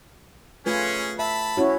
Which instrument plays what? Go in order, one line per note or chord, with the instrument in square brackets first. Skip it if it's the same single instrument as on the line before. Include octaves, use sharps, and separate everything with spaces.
[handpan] A3 F4 B4 [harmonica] C#4 G#4
[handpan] E5 [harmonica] A5 B5
[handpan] C#4 E4 F#4 [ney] C#5